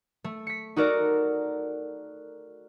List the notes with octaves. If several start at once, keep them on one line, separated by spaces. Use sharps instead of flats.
A3
B6 C#7
D#4 F#4 A4 A#4 D5